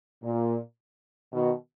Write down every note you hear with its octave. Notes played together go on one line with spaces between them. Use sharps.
A#2
B2 D#3